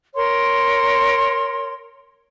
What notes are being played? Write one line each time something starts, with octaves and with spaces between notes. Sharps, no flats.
A#4 C#5 C6